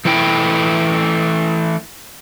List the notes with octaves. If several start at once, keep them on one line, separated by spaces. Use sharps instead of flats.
E3 A3 E4 G5